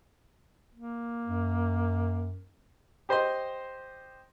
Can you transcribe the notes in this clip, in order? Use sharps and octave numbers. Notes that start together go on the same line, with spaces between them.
A#3
F#2
G4 C5 D#5 C6